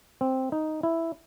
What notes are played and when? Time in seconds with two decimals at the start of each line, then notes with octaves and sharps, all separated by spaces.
0.21 C4
0.52 D#4
0.83 E4